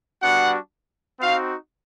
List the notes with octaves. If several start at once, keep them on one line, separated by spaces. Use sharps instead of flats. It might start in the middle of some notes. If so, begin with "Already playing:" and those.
G3 B3 D4 F#4 F#5
C4 D#4 F#4 F5